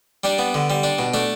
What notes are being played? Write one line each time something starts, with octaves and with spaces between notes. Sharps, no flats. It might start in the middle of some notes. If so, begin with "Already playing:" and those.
G3 D4
B3
D3
G3
D4
B2
A3 D4